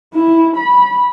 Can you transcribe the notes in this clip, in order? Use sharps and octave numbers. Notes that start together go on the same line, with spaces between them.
E4
B5